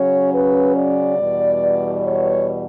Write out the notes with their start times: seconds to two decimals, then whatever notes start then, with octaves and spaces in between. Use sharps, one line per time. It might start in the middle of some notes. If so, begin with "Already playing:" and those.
Already playing: C#3 F#3 C#4 C#5
0.32 B4
0.75 D5
1.18 E2 B2 G3
2.04 C#5